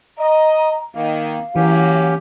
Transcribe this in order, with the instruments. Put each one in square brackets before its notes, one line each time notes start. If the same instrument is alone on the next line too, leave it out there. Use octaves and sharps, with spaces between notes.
[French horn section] D#5 [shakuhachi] A#5
[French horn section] D#3 [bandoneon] A#3 [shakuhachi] F5
[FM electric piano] E3 [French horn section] F#3 A#3 [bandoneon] C#4 G4